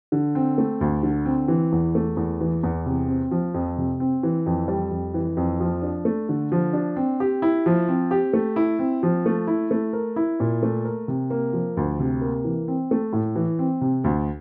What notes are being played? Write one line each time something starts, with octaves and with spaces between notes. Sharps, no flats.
D3
C4
A3
D2
D3
C4
E3
E2
A3
E2
E3
E2
C3
C4
F3
F2
C3
C4
E3
F2
G3
F2
E3
F2
F3
D4
A3
D3
F3
D4
C4
G4
E4
F3
C4
G4
A3
E4
C4
F3
A3
E4
A3
A#4
E4
A#2
A3
A#4
C3
A#3
F3
D2
C3
A#3
E3
C4
A3
A2
E3
C4
C3
D2